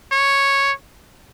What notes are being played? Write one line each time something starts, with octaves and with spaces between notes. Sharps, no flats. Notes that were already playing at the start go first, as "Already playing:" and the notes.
C#5